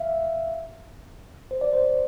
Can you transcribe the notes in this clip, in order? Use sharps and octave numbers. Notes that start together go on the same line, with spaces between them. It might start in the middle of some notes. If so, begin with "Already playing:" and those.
Already playing: E5 F5
C5
D5
C5